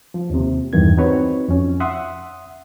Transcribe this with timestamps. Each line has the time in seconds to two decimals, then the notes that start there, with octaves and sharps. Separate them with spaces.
0.14 F3
0.30 D#2 C3
0.73 E2 G2 D#3 E3 G#6
0.98 C4 D#4 F#4 B4 C#5
1.48 F2 C#4
1.80 E5 F#5 C6 D#6